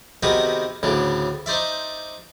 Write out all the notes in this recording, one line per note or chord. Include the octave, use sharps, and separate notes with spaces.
C3 D#3 B3 F#4 G#4 B5
D2 A2 C#3 D4
D#4 C5 D5 E5